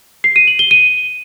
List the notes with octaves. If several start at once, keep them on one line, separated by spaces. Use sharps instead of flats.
C7
D#7
F#7
G7
D#7